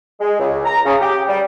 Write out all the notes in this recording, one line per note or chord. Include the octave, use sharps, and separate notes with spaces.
G#3
C#2
A#5
C#3
G4
G3